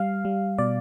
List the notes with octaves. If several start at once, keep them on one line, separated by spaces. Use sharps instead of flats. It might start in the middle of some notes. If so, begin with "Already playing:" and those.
Already playing: G3 F5
G3
B2 D5